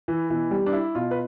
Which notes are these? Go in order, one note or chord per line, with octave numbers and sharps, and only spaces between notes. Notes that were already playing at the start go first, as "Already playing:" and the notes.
E3
B2 E3
G3
D4
E4
B2 F4
B4